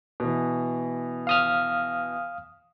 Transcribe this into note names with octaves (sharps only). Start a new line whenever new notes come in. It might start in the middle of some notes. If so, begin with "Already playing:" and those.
B2 E3
F5 D#6 F6